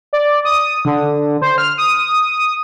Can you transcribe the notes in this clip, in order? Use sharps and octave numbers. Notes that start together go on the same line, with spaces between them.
D5
D#6
D3
C5
F6
D#6